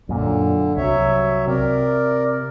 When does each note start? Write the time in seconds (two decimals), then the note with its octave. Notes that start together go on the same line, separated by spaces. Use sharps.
0.09 F#2 A#2 D3
0.77 C2 F#3 C#5 E5
1.47 C3 A#4 D5